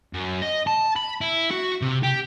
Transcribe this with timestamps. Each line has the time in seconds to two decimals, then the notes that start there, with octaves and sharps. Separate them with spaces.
0.13 F#2
0.42 D#5
0.67 A5
0.96 B5
1.21 E4
1.50 F#4
1.81 C3
2.03 G4